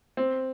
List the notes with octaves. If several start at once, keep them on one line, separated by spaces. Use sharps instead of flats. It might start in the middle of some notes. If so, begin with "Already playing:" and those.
C4